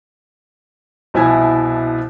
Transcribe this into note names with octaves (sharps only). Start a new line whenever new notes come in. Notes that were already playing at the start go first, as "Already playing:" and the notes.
C2 B2 F3 E4 G#5 G#6